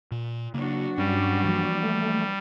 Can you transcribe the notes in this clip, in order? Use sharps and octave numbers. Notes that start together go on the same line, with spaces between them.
A#2
C#3 F#3 A#3 D4 F#4
G2 G3 C#4
E3 F3 A#3
A3